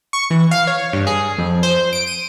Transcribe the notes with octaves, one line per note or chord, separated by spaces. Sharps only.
C#6
E3
F5
C#5
G2
G#4
F2
C5
D7
D#7